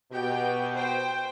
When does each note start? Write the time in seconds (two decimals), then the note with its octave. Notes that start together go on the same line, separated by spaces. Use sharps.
0.11 B2 G4 G5
0.75 C5 G5